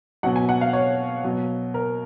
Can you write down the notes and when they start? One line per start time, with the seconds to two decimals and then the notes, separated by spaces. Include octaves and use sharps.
0.23 B2 F#3 F#5
0.36 G#5
0.49 F#5
0.61 F5
0.73 C#5
1.24 B2 F#3
1.74 A#4